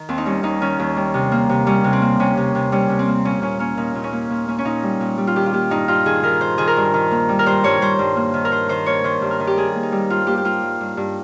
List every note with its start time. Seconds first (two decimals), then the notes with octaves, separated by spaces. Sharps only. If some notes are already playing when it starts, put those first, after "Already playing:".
Already playing: D#3
0.09 D#2 C4
0.18 D#4
0.26 G3 C#4
0.43 D#2 D#4
0.61 D#3 C#4
0.79 D#2
0.97 G3
1.14 C3
1.32 A#3
1.49 C3
1.66 G3 C#4
1.84 C3
1.93 C4
2.02 A#3
2.19 C3 C#4
2.37 C3
2.55 C3
2.72 G3 C#4
2.90 C3
2.99 C4
3.08 A#3
3.25 A#2 C#4
3.42 A#2 C#4
3.59 A#3 C#4
3.77 A#2 D#4
3.95 A#2
4.04 C#4
4.13 A#3
4.30 A#2
4.48 A#3 C#4
4.58 C#4
4.65 A#2 D#4
4.83 G3
5.00 A#2
5.18 G3
5.27 F4
5.36 D#3 G4
5.46 F4
5.53 A#3 G4
5.70 G2 D#4
5.88 G2 F4
6.06 D#3 G#4
6.23 D#3 A#4
6.41 D#3 C5
6.58 D#3 G#4
6.68 A#4
6.77 G2
6.94 D#3
7.11 A#3
7.29 G3
7.39 A#4
7.46 G2 C5
7.64 G2 C#5
7.81 G2 C5
7.99 G2
8.16 A#3
8.34 D#3
8.45 A#4
8.52 D#3 C5
8.69 D#3 C5
8.86 A#3 C#5
9.04 D#3 C5
9.22 G2
9.31 A#4
9.40 D#3
9.47 G4
9.57 G3 G#4
9.75 A#3
9.83 D#4
9.92 G3
10.10 G2 F4
10.27 A#3 G4
10.37 G4
10.44 A#3 F4
10.62 G2
10.81 G2
10.97 G2